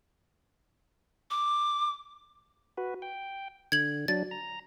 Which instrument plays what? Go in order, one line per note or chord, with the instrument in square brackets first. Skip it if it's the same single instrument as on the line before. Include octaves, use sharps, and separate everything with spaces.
[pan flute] D6
[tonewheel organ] F#4 B4
G5
[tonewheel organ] D3 [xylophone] G#6 F#7
[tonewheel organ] F#3 D4 [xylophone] A6
[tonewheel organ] A#5